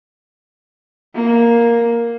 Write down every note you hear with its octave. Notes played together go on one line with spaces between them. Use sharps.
A#3